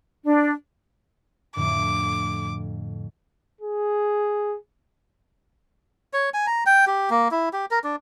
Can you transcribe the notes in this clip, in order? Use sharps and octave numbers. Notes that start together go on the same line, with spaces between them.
D4
F2 A2 D3 D6
G#4
C#5
G#5
A#5
G5
G4
A#3
E4
G4
A#4
D4